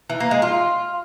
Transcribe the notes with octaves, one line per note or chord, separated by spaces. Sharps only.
E3
A#3
G#3
F4